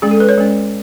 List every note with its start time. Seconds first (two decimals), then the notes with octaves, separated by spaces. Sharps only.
0.02 G#3 C#4 G#4
0.11 A4
0.20 B4
0.29 C#5
0.38 G#3 C#4